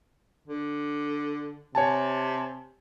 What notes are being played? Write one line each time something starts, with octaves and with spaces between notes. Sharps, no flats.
D3
C3 C#5 G#5 A5